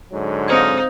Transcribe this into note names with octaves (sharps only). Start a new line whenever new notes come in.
G#2 D3 F#3
C4 D#4 C5 G#6